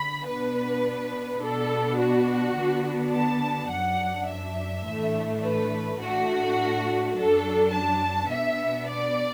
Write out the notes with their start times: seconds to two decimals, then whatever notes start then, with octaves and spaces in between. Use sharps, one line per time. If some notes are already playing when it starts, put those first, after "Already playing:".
Already playing: D3 B5
0.25 B2 B3 D4 B4
1.41 B2 B3 D4 A4
1.98 F#4
2.56 D3 B3 D4
3.14 A5
3.71 F#2 F#3 D4 F#5
4.28 E5
4.86 A2 E3 A3 D4
5.43 B4
6.00 A2 A3 D4 F#4
7.15 F#2 F#3 D4 A4
7.73 A5
8.30 B2 B3 D4 E5
8.89 D5